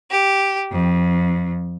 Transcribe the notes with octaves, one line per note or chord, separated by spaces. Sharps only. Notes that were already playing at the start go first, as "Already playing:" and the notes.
G4
F2